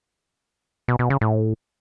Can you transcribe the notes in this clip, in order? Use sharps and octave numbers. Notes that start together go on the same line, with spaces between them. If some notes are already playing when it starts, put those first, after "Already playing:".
B2
B2
C#3
A2